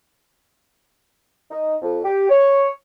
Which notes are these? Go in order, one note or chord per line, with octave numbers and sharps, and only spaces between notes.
D#4
F2
G4
C#5